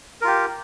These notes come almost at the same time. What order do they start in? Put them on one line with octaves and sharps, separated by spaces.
A#4 F4 G4